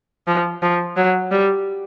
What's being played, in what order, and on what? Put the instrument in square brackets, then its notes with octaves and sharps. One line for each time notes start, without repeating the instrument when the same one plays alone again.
[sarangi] F3
F3
F#3
G3